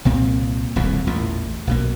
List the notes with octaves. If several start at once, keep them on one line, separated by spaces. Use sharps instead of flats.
C2 A#2 C4
D#1 C2 F2 A2
A1 E2 A#2
B1 B2 A#3